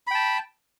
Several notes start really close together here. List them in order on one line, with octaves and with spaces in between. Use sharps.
B5 G5 A5